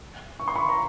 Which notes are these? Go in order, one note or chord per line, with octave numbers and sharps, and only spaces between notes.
C#6
C6
B5 C#6
A#5